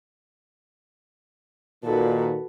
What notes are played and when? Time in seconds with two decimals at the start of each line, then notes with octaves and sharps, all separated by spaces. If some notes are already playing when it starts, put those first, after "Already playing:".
1.84 A#2 D#3 F#4 A4 B4